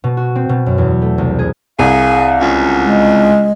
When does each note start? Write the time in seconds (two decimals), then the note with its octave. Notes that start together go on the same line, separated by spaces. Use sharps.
0.04 B2
0.17 F#4
0.35 C4
0.49 B2
0.66 F#2
0.78 E2
1.02 A3
1.18 C2
1.39 G#4
1.79 C2 G#4 F5
2.40 C#2
2.85 G#3